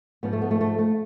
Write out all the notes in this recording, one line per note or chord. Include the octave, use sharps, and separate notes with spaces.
G#2 F3 B3
A3
B3
A3
A3
A3